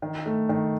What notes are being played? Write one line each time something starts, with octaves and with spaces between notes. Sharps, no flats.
D#3
A3
D#3